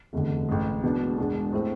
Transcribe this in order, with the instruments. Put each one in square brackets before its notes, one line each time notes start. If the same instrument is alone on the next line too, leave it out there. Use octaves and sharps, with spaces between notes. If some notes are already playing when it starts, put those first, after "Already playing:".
[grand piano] F1 E2 D3
A1 G#2 G#3
E1 E2 B2 B3 D4
E1 E2 B2 G#3 D4
A2 G#3 C4 E4